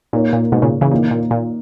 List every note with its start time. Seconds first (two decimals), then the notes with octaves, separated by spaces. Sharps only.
0.13 A#2 A#3 D#4 A#4 C#5
0.33 A#2
0.52 G#2 B2
0.62 A#2 C#3
0.81 C#3 E3
0.91 A#2 D#3 A#3 D#4
1.11 A#2
1.31 A#2